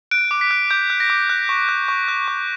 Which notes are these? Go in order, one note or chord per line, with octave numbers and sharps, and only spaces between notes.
F#6 D7
D6
B6
F#6
D6 G6
F#6
A#6
D6
F#6
C#6
F#6
C#6
F#6
C#6